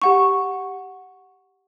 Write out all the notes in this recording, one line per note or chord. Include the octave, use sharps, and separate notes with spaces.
G4 F#5 C#6